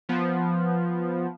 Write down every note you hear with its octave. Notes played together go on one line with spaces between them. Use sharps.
F3 B3